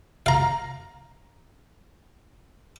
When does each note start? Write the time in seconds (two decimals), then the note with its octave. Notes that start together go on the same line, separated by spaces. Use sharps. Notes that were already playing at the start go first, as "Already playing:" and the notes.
0.26 F5 A#5